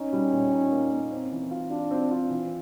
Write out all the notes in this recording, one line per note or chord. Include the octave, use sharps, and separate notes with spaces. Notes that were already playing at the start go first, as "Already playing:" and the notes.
Already playing: C#4 D#4
G3
A#2
D#4
A#3
A#3
C4
E3
F4
D4 F4
C4
F4
E3